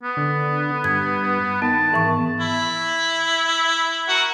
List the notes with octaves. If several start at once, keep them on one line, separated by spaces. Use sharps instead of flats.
B3
D3
G2 G#6
D#3 B3 A5
G#2 E3 C#6
E4
F#4 A#4 F#5